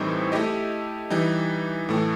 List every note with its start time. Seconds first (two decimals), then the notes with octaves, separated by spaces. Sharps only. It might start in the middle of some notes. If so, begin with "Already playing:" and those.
Already playing: A2 E3 G3 C4 D#4
0.32 A3 E4 G4 D#5
1.10 E3 G3 D#4
1.89 A2 E3 A3